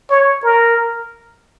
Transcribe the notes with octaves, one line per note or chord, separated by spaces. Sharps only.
C#5
A#4